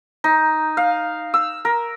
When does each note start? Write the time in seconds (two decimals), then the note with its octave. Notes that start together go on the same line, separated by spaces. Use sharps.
0.24 D#4
0.77 F5
1.34 E6
1.65 A#4